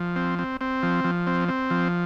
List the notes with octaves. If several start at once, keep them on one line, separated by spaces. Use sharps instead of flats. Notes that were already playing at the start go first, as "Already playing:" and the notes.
Already playing: F3
C4
C4
C4
F3
F3
C4
C4
F3